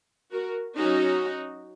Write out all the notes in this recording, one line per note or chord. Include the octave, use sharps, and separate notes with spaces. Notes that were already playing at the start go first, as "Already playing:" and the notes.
F#4 A#4
F#3 C#4 D#4 F#4